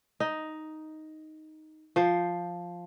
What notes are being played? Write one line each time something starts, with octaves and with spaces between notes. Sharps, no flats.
D#4
F3 C5